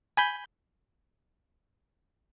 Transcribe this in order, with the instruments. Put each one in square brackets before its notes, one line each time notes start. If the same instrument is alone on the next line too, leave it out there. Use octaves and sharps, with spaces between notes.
[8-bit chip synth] G#5 B5 G6